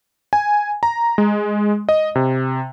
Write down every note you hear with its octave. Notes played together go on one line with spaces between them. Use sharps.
G#5
A#5
G#3
D#5
C3